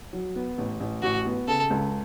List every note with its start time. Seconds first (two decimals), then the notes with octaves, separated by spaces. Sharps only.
0.13 F#3
0.36 B3
0.58 A1
0.80 A1
1.02 A1 F#4
1.26 B3
1.48 C#3 A4
1.70 C#2